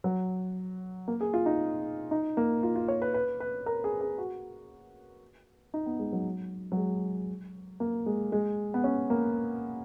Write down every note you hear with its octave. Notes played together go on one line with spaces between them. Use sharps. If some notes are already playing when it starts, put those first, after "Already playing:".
F#3
A#3
G#4
F4
D#4
D#4
A#3
F4
F4
C#5
B4
B4
B4
A#4
G#4
G#4
F#4
D#4
B3
G#3
F#3
F#3
G#3
A#3
G#3
G#3
B3
C#4
A#3